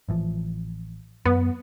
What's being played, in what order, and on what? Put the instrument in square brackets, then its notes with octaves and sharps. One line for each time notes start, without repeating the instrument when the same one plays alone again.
[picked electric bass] A1 E3 F3
[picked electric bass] F#2 [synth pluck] B3